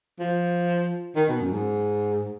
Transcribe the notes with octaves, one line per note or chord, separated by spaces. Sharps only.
F3
D#3
B2
F#2
G#2